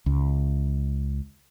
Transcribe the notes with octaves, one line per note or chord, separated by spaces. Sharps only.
C#2